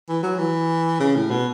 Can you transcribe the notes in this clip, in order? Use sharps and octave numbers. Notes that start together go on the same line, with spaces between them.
E3
F#3
E3
C#3
A2
B2